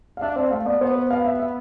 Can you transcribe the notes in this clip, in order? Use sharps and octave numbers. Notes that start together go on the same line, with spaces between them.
F5
D4 E5
C4 D5
A3 F5
B3 D5
B3 C5
C5
F5
E5
E5